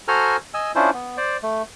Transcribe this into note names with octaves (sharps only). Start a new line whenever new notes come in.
F#4 A4 C5 G#5 A#5 F6
D#5 G#5 E6
C#4 D4 E4 F4 C5
B3
C5 D5
A3